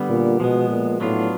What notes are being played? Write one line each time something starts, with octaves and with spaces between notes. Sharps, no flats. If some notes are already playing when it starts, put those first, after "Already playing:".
Already playing: D3 G3 B3
A#2
B2 F3 G#3 B3
A#2
A2 F#3 B3 D4 F4